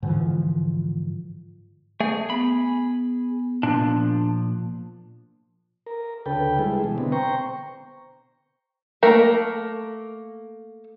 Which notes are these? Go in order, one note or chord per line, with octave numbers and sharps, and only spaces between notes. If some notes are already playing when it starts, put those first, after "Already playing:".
G#2 D3 E3 F3
A3 G#4
B3 B5
A#2 F3 D4
A#4
D2 C#3 A4 B4 G5
G3 G#3 E4 G#4
B2 E3
B2 D3 B3 C4
C5 G5 A#5 C#6
A3 A#3 A#4